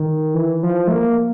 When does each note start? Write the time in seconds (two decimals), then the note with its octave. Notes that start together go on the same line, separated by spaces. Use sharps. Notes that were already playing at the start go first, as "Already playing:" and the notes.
Already playing: D#3
0.34 E3
0.63 F3
0.87 A3
0.92 A#3